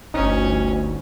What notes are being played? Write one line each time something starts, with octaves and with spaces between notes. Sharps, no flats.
G1 D2 C#4 D#4